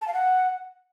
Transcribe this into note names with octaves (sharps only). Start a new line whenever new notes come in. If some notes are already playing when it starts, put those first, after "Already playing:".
A5
F5
F#5